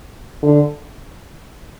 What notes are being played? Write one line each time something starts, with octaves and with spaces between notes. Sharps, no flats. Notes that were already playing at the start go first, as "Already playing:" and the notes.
D3